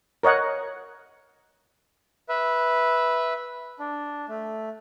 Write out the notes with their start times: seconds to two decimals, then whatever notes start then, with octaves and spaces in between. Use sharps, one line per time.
0.23 A#4 C#5 D#5 F#5
2.29 B4 E5
3.79 D4
4.29 A3